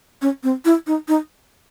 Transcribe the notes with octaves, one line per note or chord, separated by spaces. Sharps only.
C#4
C4
E4
D#4
D#4